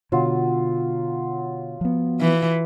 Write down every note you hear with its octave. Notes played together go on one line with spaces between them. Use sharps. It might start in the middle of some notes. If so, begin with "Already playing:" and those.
B2 D3 F#3 F4
F3 B3
E3